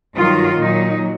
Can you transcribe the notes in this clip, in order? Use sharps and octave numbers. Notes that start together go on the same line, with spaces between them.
G2 D#3 F#3 F4
A#2 F#3 D#4